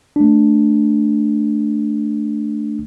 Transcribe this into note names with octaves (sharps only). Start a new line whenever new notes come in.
A3 D4